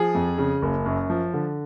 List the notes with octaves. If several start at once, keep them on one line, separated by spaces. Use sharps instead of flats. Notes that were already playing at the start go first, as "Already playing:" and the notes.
Already playing: F3 G#4
F2
C#3
F#1
F#2
F3
D3